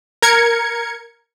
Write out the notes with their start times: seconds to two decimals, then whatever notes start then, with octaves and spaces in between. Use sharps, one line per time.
0.22 A#4 G#6 C#7